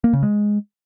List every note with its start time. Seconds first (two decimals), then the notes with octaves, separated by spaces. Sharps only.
0.04 A#3
0.13 C#3
0.23 G#3